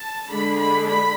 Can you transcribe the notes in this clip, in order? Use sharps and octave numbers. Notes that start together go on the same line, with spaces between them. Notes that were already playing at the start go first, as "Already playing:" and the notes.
Already playing: A5
D3 G#3 D4 B5
B5
B5